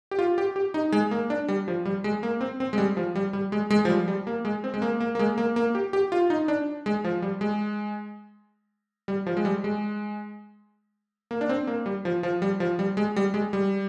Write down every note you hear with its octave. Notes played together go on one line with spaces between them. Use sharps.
G4
F4
G4
G4
D#4
G#3
A#3
D4
G3
F3
G3
G#3
A#3
C4
C4
G#3
G3
F3
G3
G3
G#3
G#3
F3
G3
G3
A#3
G#3
C4
G#3
A#3
A#3
A#3
G#3
A#3
A#3
G4
G4
F4
D#4
D4
G#3
F3
G3
G#3
G3
F3
G#3
G3
G#3
A#3
D4
C4
A#3
G3
F3
F3
G3
F3
G3
G#3
G3
G#3
G3